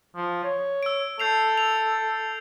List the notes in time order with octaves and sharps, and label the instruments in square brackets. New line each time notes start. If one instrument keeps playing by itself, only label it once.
[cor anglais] F3
C#5
[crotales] E6 D7
[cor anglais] A4 [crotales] G6 C7 F7
[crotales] F7